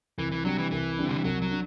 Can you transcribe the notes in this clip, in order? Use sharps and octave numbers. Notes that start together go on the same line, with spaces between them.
C2 E3
E3
C3 F#3 G3 D4
E3
C2 E3
C3 G3 D4
D3
E3
C2 F#3
F#3
D4